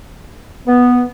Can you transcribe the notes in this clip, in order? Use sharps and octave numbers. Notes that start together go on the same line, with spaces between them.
B3